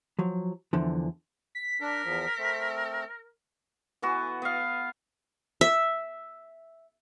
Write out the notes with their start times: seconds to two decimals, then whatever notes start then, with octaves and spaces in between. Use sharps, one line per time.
0.19 F3 F#3
0.73 E2 D3 E3 F3
1.55 B6
1.81 D4 A#4
2.05 E2 F3
2.38 A3 C4
4.02 E3 B3 F#4
4.42 B3 F5
5.61 E5